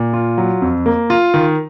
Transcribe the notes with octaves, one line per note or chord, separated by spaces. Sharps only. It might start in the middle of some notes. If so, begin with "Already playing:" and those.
Already playing: A#2
F4
F#3
F2
A#3
F4
D#3